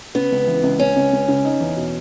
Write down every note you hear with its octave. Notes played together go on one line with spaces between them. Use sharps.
C#3 B3
C#2
E3
C#2
C#2 C#4
C#2
C#2
C#3
D#4
E2
B2